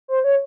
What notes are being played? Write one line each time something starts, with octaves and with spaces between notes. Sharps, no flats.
C5
C#5